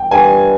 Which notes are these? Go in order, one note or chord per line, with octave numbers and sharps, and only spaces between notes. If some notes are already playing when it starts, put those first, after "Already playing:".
Already playing: G5
G2 G#5